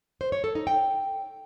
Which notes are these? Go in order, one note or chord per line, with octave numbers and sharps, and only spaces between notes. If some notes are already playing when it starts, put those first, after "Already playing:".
C5
C#5
A4
D#4
G5